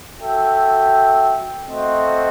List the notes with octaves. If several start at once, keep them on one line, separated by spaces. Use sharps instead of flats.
F#4 A4 E5 G5
A3 C4 F#4 C5 D#5